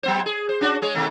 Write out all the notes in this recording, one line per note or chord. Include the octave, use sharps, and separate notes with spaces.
F#3 B3 C5
G#4
C5
C#4 D4 F#4
G#3 G#4 C#5
B2 D#3 A3